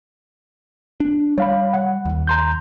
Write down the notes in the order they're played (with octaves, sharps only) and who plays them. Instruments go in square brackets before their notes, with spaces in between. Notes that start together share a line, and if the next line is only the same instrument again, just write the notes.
[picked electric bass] D4
[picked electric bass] G3 [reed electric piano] C#5 F5 B5
[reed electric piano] F#5
[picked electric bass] D#2
[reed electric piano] A#5 C6 G6